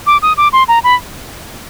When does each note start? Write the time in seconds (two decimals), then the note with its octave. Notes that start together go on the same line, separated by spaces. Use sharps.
0.07 D6
0.22 D#6
0.37 D6
0.53 C6
0.68 A#5
0.84 B5